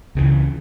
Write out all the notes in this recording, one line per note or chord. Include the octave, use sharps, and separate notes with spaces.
C#2 C#3 E3